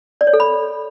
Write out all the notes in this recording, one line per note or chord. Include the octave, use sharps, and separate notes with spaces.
D5
C#5
A4
B5